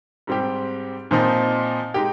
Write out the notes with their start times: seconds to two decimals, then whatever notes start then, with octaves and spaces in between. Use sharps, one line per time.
0.27 G#2 G3 C4 G4
1.11 A#2 F3 C4 D#4
1.94 G#3 D#4 G4